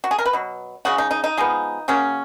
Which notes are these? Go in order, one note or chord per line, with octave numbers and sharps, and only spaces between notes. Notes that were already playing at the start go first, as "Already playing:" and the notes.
F#4
G#4
A#4
B4
B2 F#3
C#3 G#3 C#4 F#4
D#4
D#4
D#4
F3 G#3 B3
C#3 F#3 A#3 C#4